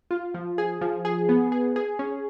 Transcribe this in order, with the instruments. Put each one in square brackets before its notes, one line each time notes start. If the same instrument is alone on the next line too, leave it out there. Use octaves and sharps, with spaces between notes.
[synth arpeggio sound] F4
F3
G#4
F3
G#4
B3
G#4
G#4
C#4